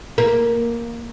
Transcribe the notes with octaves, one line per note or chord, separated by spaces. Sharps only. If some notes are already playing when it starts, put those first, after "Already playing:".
A#3